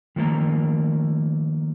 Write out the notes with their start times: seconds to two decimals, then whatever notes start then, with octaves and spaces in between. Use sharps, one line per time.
0.16 D#3 F3 A3 A#3 A#5